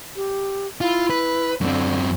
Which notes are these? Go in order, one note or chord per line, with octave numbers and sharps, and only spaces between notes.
G4
E4 F4
B4
F#2 D3 C4